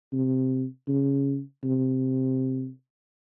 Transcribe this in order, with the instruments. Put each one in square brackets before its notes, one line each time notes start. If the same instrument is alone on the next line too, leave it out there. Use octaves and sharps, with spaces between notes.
[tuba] C3
C#3
C3